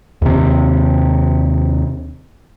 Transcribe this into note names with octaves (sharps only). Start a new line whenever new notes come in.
D#2 C3